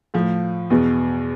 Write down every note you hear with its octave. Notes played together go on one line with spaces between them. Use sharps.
A2 F3
E2 B2